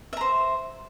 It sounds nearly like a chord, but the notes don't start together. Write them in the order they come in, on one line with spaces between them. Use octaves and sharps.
E5 A#5 C5